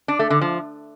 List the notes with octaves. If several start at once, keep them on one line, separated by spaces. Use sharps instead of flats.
D4
A3
D3
F3